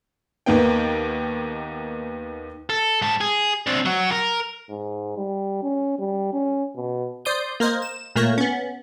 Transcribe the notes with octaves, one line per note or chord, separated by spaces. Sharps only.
D#2 D#3 A#3 B3 G5
A4
G#2 A5
G#4
C4 D4
F#3 F#4
A#4
G#2
G3
C#4
G3
C#4
B2
C5 D5 C6 D#6 G6
A#3 A#4 C5 D#5
E7
A#2 A3 A#3 A#4 C#5
B3 C#4